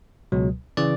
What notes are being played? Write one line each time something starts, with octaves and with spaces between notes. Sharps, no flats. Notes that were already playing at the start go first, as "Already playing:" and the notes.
C#2 B2 F#3
C#3 E3 D5